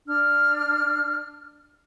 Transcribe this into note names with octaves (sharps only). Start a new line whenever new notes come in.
D4 F6